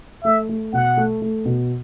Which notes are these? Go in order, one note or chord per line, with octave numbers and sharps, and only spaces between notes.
A3 E5
A3
B2 F#5
A3
A3
B2